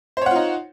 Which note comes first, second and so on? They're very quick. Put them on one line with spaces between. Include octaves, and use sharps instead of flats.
C5 C#5 F#5 F4 D#4